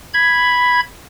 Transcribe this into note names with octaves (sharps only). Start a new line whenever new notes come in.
B5 G#6